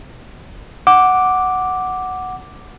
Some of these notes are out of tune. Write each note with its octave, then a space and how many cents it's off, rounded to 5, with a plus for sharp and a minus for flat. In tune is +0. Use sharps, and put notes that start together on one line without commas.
F#5 +0 D6 +0